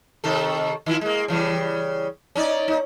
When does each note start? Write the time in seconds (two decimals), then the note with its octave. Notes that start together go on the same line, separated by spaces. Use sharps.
0.24 C3 D#3 A4
0.86 D#3 E4 F4
1.01 G#3 A#3
1.28 C#3 E3 G3
2.35 C#4 D#4 D5
2.68 D#4